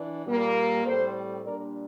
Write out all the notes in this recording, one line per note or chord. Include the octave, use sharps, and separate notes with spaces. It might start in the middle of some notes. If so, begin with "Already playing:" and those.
Already playing: E3 D4
A#2 G3 A#3
A2 G3 C4 A4 C5
A#2 G3 D4 A#4 D5